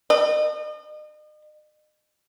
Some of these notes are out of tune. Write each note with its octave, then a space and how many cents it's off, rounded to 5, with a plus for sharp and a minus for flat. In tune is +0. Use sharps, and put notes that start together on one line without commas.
D#5 -40